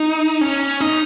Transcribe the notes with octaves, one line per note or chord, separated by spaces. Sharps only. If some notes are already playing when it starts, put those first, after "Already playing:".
Already playing: D#4
C#4
D#4